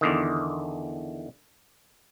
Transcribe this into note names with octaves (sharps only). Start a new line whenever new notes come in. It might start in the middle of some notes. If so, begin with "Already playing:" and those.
E2 D3 D#3